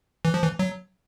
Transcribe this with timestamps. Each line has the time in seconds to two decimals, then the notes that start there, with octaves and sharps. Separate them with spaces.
0.25 E3
0.34 F3
0.43 E3
0.59 F#3